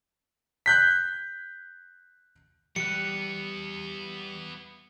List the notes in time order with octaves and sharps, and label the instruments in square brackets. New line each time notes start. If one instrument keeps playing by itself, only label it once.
[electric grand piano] F#6 G6 B6
[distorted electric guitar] E3 B3 [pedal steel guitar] G3 F#6 [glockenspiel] C#7